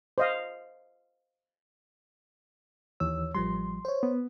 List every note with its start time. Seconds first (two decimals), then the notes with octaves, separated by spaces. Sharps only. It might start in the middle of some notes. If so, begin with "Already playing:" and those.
0.18 C5 D#5 F5
3.00 D#2 E3 C#5 E6
3.35 A1 F3 G3 C6
3.85 C5 C#5
4.03 B3